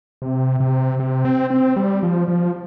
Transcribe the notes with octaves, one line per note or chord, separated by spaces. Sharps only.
C3
C3
C3
C4
C4
G3
F3
F3